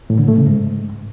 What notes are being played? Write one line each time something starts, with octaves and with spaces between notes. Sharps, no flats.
A2
D3
A3
C#3
G#2